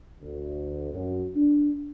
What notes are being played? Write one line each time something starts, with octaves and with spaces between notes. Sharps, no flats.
D2
F#2
D4